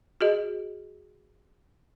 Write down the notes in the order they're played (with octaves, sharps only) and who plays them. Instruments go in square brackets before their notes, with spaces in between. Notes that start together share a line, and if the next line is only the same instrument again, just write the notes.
[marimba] F#4 G#4 D#5